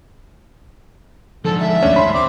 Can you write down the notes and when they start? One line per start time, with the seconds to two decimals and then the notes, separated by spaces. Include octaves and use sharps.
1.45 G#2 D3 F3 A4
1.60 E5
1.82 D#2 A3 C#4 D4
1.96 B5 C6
2.14 C4 D6